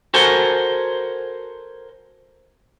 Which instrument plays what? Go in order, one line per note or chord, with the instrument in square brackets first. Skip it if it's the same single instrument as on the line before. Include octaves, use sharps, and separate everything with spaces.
[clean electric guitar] F#4 A4 A#4 C5 F#5 G#5